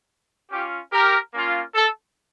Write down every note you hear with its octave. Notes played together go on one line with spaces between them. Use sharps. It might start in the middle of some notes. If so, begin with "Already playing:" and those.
C#4 F4 G4
G4 A#4
A#3 C#4 F4
A4